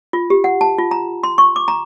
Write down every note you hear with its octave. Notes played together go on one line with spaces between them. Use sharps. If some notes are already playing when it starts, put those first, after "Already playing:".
F4
G4
F#5
A5
F4
A#5
C6
C#6
D6
A#5